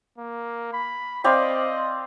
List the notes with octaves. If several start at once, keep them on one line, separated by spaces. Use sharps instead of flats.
A#3
B5
C4 D5 D#5 F5